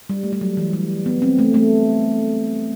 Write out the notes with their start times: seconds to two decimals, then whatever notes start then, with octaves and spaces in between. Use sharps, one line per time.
0.09 G3
0.24 A3
0.33 G3
0.41 F#3
0.57 E3
0.73 G3
1.06 B3
1.22 C4
1.39 A3
1.54 A3